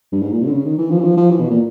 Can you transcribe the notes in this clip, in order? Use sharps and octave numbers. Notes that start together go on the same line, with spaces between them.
G2
G#2
A#2
C3
D3
C#3
D#3
E3
F3
E3
F3
F3
E3
B2
A#2